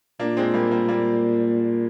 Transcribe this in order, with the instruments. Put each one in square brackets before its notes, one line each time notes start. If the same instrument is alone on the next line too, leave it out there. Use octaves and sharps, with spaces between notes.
[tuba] A#2 [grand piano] A#3 D4
[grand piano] G#3 C4
G3 A#3
G3 A#3
G3 A#3